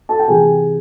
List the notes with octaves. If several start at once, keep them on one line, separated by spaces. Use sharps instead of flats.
A4 A5
G5
C3 E3 G#4 G#5